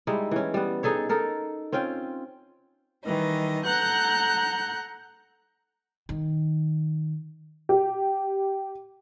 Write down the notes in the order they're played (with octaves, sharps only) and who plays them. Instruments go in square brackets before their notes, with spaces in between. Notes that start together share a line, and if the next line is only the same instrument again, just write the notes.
[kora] G3 G#3 D#4 E4
E3 C#4
G3 B3
D#4 G#4 A4 C#5
D#4 A4 A#4
C4 C#4 F4 G5
[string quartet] D#3 E3 G3 D#5
A4 F#5 A#5 F#6 G6
[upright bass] D#3
[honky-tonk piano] G4